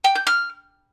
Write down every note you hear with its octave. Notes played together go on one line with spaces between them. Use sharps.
G5
G6
F6